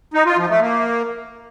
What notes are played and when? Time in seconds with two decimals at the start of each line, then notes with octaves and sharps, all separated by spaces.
0.14 D#4
0.26 F4
0.37 F3
0.49 A3
0.61 A#3